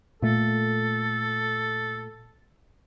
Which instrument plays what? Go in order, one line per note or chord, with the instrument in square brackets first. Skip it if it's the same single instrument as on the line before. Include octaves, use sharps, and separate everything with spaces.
[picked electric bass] A#2 A3 [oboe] A4